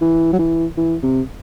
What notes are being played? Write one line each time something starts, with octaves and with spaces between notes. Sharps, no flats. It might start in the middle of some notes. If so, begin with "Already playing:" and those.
E3
F#3
E3
E3
C3